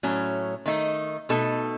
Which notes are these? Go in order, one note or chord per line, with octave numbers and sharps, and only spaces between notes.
A2 F#3 A3 C#4
D#3 A3 D#4
B2 A3 D#4 A4